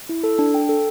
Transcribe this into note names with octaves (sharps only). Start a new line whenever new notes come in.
E4
A4
D4
G5
A4